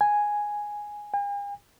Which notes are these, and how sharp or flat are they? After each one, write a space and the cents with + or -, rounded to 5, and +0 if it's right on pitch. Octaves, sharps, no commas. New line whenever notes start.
G#5 +0
G#5 -45